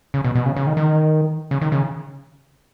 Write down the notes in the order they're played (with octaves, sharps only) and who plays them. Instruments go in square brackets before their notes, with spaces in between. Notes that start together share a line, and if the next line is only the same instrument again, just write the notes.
[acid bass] C#3
B2
B2
C#3
C#3
D#3
D#3
C#3
D#3
C#3